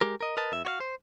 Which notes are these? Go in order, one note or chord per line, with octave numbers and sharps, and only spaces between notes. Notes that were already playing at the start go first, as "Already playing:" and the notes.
G#3 G4 A#4
A#4 D#5
A#4 B4 D#5 A5
F2 E5
F#4 C#5 F5
C5